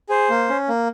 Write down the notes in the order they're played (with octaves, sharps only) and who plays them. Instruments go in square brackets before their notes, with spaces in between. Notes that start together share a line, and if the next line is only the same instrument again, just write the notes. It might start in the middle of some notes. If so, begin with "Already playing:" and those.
[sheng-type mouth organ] G#4 C5
A#3
C#4
A#3